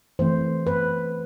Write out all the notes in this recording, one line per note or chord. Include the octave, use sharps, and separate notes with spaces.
E3 A3 C4 C5
B4